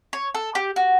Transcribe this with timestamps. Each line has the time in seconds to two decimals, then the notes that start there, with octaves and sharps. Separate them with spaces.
0.13 C#5
0.35 A4
0.55 G4
0.76 F#4